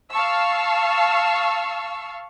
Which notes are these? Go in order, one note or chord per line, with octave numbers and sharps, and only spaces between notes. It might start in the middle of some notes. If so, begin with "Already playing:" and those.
F5 A5 C#6 E6